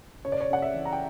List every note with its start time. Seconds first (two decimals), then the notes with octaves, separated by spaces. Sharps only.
0.25 C#3 C#5
0.32 D5
0.41 C#5
0.50 C#3 F#5
0.62 E5
0.74 E3
0.85 A#5
0.93 G5